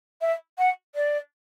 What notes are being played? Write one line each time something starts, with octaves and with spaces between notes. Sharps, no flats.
E5
F#5
D5